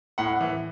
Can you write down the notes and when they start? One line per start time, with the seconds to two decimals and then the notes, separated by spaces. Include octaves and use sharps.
0.18 A2 F#5
0.41 E3